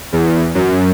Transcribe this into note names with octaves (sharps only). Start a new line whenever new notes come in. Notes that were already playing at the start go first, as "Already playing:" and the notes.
E2
F#2